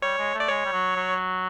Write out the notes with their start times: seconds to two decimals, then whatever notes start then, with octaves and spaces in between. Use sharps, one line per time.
0.02 G3 C#5
0.18 G#3
0.34 A3
0.40 D5
0.49 G#3 C#5
0.65 G3
0.73 F#3
0.96 F#3